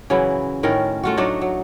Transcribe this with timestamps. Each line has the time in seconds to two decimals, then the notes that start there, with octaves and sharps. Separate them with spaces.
0.10 C#3 E3 F#3 E4
0.63 A2 D#3 C#4 A#4
1.04 A3 F4 F#4
1.17 F#3 A3 D4 D#4
1.41 F#3